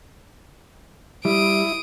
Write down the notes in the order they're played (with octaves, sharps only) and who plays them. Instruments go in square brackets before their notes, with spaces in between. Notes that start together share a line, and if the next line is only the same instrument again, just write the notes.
[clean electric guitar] G3 [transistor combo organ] E4 [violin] D#6 D7